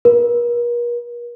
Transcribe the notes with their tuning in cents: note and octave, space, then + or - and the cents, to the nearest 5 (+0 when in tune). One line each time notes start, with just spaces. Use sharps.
A#4 +45